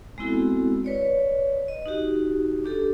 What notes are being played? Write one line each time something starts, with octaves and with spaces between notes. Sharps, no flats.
G#3 B3 C4 E4 F#4 A4
B4 C#5 D5
D#5
D#4 F#4 G4
D4 G4 A4